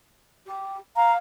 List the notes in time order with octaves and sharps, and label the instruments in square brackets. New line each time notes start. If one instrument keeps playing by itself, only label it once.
[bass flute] G4
[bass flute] F5 [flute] A#5